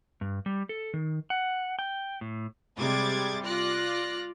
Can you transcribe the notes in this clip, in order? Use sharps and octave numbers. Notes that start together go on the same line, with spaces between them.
G2
G3
A4
D#3
F#5
G5
A2
C3 G3 G#3 D6 G#6 A6
F4 D5 F#6 A#6